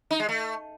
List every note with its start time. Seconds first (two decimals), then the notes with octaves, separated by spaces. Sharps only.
0.11 D#4
0.20 G#3
0.29 A3